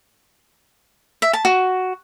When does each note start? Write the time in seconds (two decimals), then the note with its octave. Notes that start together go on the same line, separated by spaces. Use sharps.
1.22 E5
1.33 A5
1.45 F#4